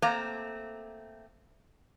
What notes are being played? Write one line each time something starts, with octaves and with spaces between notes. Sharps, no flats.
A3 A#3 C4 A#5